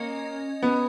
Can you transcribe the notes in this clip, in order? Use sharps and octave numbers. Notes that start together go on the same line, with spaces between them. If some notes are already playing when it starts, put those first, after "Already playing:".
Already playing: A#3 C#4 D#5
B3